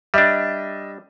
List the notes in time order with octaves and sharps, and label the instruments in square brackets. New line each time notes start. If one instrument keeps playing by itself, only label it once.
[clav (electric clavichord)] G3 D4 [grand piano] D#5 E5